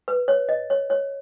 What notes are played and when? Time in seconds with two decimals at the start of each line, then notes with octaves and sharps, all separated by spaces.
0.08 B4
0.28 C#5
0.49 D#5
0.70 C#5
0.90 C#5